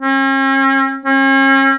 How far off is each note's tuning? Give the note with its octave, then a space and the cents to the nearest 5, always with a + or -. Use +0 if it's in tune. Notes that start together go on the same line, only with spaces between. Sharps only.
C#4 -45
C#4 -40